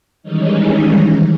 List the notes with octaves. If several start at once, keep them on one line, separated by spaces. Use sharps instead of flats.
D#3 E3 G3 G#3 C#4 D#4